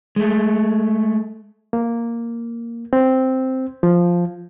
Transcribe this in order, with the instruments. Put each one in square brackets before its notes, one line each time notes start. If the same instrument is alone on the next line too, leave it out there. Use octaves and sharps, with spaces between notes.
[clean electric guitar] G#3 A3
[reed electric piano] A#3
C4
F3